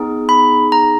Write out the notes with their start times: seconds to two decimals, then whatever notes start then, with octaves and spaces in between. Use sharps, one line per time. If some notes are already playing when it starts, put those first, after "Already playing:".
Already playing: B3 D#4 G#4
0.29 B5
0.72 A#5